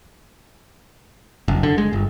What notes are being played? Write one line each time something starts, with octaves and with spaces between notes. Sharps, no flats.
F#1
D3
G#3
G1